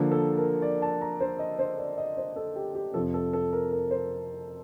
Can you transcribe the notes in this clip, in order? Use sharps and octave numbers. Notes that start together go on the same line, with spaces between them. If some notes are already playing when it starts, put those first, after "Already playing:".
Already playing: D3 F3 A#3
A4
A#4
D5
A5
A#5
C5
D#5
C5
D5
D#5
C5
A4
G4
G4
F2 C3 F3 A4
A4
A4
A#4
A#4
C5